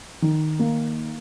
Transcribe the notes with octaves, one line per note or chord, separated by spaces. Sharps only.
D#3
A#3